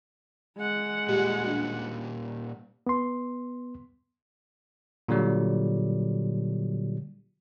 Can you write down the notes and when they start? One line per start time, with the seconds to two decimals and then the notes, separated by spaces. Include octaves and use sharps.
0.57 G#3 F#5
1.09 A#2 G3 G4
1.44 D4 F#4
2.87 B3 C6
5.08 A#2 D3 F#3 G3